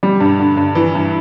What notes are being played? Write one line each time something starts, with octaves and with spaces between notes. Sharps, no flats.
G3
G2
D3
G2
E3
G2